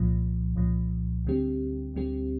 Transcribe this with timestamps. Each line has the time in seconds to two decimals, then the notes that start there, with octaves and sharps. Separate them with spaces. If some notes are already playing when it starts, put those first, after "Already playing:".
Already playing: C2 A#2 F3
0.56 C2 A#2 F3
1.25 D2 D3 G3 C4 G4
1.94 D2 D3 G3 C4 G4